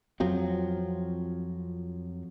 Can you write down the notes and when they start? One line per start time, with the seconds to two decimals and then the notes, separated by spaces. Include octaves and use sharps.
0.20 F2 F3 F#3 C4